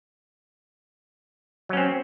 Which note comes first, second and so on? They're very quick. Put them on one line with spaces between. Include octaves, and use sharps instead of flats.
F#3 C#4 C4